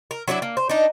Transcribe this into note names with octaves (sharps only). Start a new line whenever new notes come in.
A#4
F#3 A3 D4 E4
A#3
C5
D4 D#4